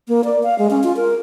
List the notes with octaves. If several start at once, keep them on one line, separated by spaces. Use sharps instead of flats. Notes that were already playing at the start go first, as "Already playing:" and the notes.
A#3
D5
F5
G#3
C#4
F4
A#4